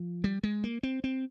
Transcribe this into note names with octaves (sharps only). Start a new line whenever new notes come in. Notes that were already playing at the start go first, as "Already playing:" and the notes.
Already playing: F3
G3
G#3
A#3
C4
C4